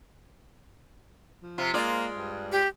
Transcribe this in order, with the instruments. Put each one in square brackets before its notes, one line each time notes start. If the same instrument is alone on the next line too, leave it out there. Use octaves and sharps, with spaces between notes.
[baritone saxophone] F3
[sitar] C3 F4
[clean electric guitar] G#3 [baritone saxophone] A#3 [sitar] F4 D5
[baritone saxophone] G2
[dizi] G4